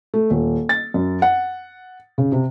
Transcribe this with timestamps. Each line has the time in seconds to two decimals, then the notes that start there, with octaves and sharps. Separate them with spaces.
0.14 A3
0.30 D#1
0.69 A6
0.94 F#2
1.22 F#5
2.18 C#3
2.32 C3